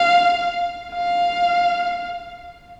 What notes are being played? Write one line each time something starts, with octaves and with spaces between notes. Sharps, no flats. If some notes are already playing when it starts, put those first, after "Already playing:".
Already playing: F5
F5